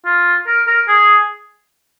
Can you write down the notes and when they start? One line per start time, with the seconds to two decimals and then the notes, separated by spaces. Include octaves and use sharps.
0.06 F4
0.47 A#4
0.68 A#4
0.88 G#4